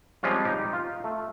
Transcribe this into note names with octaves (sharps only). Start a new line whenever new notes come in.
F3 G3 G#3 C4 C#4 F4
D#4 G4
F4
A3